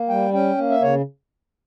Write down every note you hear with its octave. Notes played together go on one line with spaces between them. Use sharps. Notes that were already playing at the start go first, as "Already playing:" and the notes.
Already playing: A#3
G3 G5
C#4 G5
A#3
E5
C#3 C#5